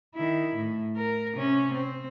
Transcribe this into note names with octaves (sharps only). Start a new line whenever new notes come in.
D#3 E4
A2
A#4
C3 C#4
C4